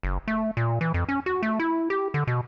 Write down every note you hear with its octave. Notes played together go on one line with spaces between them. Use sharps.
F#1
A3
A#2
E3
F2
C#4
F#4
A3
E4
G4
D3
B2